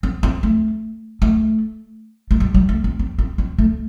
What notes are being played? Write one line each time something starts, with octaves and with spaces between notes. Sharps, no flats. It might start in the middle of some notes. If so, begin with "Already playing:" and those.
C4
C4
A3
A3
A3
G3
G3
A3
C4
C4
C4
C4
A3